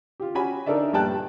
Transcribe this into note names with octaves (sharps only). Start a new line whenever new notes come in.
F4 G4
C#4 F#4 G4 G#5 B5
D4 D#4 A4 A#4 D5 E5
A#1 G2 G3 G5 A5 F#6